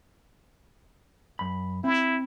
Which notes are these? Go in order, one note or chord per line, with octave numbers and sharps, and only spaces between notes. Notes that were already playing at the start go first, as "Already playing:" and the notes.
F#2 B5
C4 E4